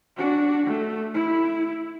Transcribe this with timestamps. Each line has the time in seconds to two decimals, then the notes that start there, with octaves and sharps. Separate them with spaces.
0.17 D4 F#4
0.67 A3
1.15 E4